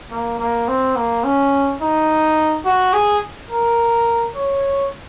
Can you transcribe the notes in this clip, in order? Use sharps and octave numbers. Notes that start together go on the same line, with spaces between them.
A#3
A#3
C4
A#3
C#4
D#4
F#4
G#4
A#4
C#5